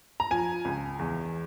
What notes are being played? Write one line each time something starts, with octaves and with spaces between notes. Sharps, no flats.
A#5
F3 G#5
C#2
E2